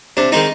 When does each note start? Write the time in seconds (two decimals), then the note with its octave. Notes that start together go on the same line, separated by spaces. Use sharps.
0.17 C3 D4
0.32 D#3 G#3 C4 D#4